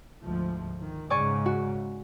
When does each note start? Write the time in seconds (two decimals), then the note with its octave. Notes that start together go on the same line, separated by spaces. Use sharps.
0.24 D2 G#2 F3
0.79 D#3
1.10 G#2 C#3 D5 G#5 C#6
1.46 F#4